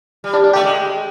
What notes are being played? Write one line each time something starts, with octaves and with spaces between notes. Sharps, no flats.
G3
D4
D4
A3 G4
G#3